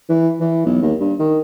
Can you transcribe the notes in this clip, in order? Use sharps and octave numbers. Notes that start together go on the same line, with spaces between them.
E3
E3
B1
D#2
G2
D#3